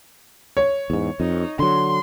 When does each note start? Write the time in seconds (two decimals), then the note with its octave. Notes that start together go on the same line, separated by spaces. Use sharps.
0.57 C#5
0.90 E2 G#2
1.20 F2 D#4
1.59 D3 F#3 C6